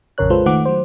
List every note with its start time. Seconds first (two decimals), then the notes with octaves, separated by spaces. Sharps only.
0.18 A#1 F2 C#3 A#4 C#5 F#6
0.30 G#3 F4 A4 B4 C5
0.46 D#3 A3 F#5 D6
0.65 F#3 C5